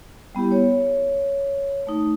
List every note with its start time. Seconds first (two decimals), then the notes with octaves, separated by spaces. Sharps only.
0.35 G3 B3 E4 G4
0.52 C#5
1.87 A3 D#4